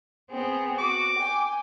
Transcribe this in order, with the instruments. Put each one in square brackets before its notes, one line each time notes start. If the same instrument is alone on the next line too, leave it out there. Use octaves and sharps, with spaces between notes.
[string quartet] B3 C4 G#4
[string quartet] F#4 [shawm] D6
[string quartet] G5 G#5